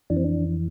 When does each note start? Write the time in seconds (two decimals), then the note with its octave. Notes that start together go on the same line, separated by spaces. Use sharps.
0.10 F2 E3 D4
0.16 C4
0.24 D4